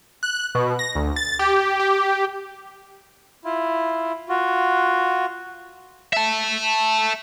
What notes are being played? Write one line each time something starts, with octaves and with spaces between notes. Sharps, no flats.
F#6
B2
A#6
D2
A6
G4
G4
E4 F4
F4 F#4
E5 A5